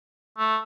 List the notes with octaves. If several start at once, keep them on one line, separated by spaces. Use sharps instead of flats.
A3